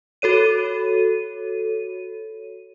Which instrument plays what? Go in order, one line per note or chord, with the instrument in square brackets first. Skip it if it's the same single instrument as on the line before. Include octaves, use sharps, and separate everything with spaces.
[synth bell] F#4 A4 C#5 D#7